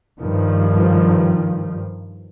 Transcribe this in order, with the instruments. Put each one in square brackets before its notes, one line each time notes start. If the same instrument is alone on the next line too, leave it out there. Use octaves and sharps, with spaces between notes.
[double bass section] G2 D#3 F3